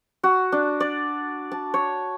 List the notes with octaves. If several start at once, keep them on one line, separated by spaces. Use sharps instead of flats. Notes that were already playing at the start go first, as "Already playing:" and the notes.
F#4
D4
D5
A5
C#5